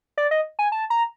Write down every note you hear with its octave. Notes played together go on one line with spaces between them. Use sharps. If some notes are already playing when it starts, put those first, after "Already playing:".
D5
D#5
G#5
A5
A#5